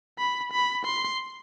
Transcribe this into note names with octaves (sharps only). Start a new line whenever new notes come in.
B5
B5
C6